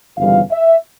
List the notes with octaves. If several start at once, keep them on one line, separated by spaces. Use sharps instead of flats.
G1 F2 C#3 E3 G3 F5
E5